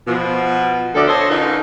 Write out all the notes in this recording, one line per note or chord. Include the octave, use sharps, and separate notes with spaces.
B2 F3
D2 A4 D5
A4 C5 C#5 D#5
D3 C#4 D#4 F4 A#4 B4